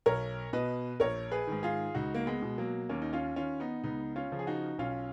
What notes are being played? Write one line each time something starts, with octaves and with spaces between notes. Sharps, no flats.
B1 A#4 C#5
B2 B4 D#5
A#1 A#4 C#5
G#4 B4
G#2 D#3
F4 G#4
C#2 D#4 F#4
A#3
G#3 B3
B2
F#3 A#3
D#2 A#3 C#4
D#4
C#4 F4
D#3 C#4 F4
B3 D#4
C#2 B3 D#4
C#4 F4
C#3 F3
G#4
D#4 F#4
B1 C#4 F4